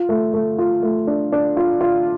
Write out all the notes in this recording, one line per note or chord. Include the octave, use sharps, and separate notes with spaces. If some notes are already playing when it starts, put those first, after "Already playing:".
Already playing: F4
A3
A3
F4
A3
D4
D4
F4
F4